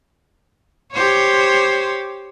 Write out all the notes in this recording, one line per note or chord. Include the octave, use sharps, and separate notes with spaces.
G4 C5 C#5